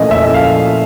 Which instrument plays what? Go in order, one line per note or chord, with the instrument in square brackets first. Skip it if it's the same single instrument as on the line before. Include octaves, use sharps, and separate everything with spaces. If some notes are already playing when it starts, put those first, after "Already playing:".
Already playing: [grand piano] A#2 F3 A3 C#4 E4 [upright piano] D#5
[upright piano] E5
F5